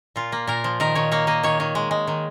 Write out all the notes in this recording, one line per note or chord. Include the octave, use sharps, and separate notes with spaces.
A#2 F4
A#3
A#2 A#4
F3
D#3 A#4
D#3 C#5
A#3 C#5
A#3 D#5
D#3 C#5
D#3
G#3
G#3
D#3